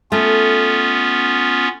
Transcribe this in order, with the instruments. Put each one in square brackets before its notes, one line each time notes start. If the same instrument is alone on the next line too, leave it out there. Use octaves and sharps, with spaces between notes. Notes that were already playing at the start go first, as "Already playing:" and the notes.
[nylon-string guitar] A3 [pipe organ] B3 C#4 F4